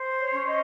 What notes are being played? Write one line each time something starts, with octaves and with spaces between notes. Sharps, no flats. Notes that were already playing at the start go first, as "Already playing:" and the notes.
Already playing: C5
C#5
C#4
D#5